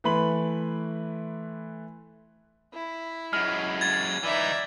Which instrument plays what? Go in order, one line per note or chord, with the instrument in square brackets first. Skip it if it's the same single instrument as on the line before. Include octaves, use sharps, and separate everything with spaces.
[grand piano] E3 A3 B4 B5 C6 F#7
[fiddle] E4
[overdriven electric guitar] F#2 G#3 [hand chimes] F6
[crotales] G#6 A6
[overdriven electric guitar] E3 D#4 [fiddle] D5 E5